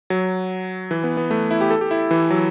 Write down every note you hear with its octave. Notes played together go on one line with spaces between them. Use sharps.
F#3
E3
B3
B3
A3
E4
G4
A4
G4
E4
E3
F#3